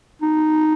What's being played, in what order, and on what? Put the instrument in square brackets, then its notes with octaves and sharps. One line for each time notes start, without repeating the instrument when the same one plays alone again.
[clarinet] D#4